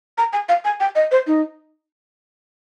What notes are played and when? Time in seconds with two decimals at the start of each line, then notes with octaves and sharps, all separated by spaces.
0.18 A#5
0.33 G#5
0.49 F5
0.65 G#5
0.80 G5
0.95 D#5
1.11 C5
1.27 D#4